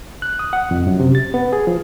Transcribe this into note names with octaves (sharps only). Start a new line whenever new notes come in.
F#6
D#6
F#5
F2
F#2
C3
A6
B3
G#4
F3